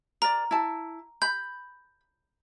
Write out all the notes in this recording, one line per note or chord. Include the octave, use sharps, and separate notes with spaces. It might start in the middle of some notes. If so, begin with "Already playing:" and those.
A#4 D5 A#5
E4 A5
B5 G6